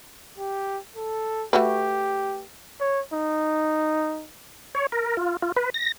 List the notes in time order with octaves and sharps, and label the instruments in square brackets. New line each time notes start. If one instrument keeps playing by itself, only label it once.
[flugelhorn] G4
A4
[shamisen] A3 F#4 B4 [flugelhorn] G4
[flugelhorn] C#5
D#4
[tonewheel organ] C#5
A#4
F4
F4
B4
A#6